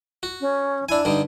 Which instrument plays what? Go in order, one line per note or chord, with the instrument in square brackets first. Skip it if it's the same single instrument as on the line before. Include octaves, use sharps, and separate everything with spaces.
[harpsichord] F#4
[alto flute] C#4
[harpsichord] D4 G#5 [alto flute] E4
[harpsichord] G2 D3 G3 [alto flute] D#4